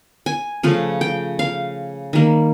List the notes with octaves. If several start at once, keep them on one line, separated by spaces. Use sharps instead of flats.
G#5
C#3 F3 A3
G5
F5
D#3 G3 A#3